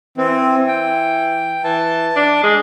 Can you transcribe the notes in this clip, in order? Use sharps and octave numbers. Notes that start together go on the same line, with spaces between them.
E3 C4
G5
E3 A5
D4
G#3